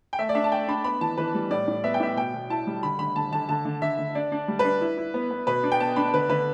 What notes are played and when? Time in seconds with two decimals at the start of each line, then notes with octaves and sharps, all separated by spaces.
0.13 G5
0.19 A3 E5
0.29 D5
0.35 D4 E5
0.44 A5
0.52 A3 G5
0.68 D4 B5
0.84 B3 B5
1.01 E3 A5
1.18 E3 B4
1.34 G3
1.51 A2 D5
1.68 A2
1.84 B3 E5
1.94 G5
2.00 A2 E5
2.17 B2 G5
2.34 B2
2.50 E4 A5
2.67 G3
2.83 D3 B5
2.99 D3 B5
3.16 D3 A5
3.32 D3 A5
3.49 D3 A5
3.65 D3
3.82 D3 E5
3.99 D3
4.15 D4 D5
4.32 D4
4.48 G3
4.59 B4
4.65 D4
4.81 E4
4.97 E4
5.14 B3
5.31 B3
5.47 B2 B4
5.63 D4
5.72 G5
5.80 B3 A5
5.96 D4 B5
6.14 D3 B4
6.29 D3 B4